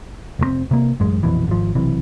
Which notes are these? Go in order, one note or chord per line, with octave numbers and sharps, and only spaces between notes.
F1 A2 C4
C3 A#3
A1 F#2 G#3
A#1 F2 B2 E3
G#1 F3
B1 C3 E3